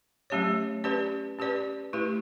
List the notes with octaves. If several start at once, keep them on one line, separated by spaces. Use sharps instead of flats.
F#3 A3 C#4 G4 C#5
C#4 G4 B4 D5
C#4 G4 B4 D5
A3 E4 G4 B4